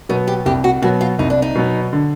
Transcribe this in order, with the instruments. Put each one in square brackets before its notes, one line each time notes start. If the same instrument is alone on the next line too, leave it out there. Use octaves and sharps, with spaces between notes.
[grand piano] B2 F#3 B3 [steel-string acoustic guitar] D#4
[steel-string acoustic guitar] G4
[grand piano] C2 [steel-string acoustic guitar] G4
[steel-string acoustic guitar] F#4
[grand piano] B2 F#3 B3 [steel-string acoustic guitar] F#4
[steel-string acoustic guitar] F4
[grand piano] C2 [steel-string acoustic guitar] D#4
[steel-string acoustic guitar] D4
D#4
[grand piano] B2 F#3 B3
D3